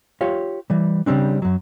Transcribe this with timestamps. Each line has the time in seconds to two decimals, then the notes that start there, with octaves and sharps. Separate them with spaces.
0.21 F4 G4 C#5 F5
0.70 E3 G3
1.06 C#3 F3 G3 C4 D4
1.42 F#2 F#3